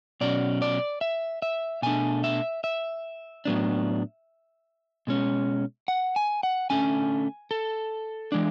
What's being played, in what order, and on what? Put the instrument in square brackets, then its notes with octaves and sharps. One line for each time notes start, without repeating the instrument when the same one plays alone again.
[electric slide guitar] B2 F#3 C#4 D5
D5
E5
E5
B2 A3 D4 G#5
E5
E5
A2 F#3 B3 D4
B2 G#3 C#4
F#5
G#5
F#5
D3 A3 C#4 G#5
A4
E3 G#3 D4